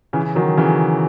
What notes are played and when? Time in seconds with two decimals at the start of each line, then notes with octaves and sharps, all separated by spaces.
0.13 C#3 E3
0.35 D#3 F#3
0.57 C#3 E3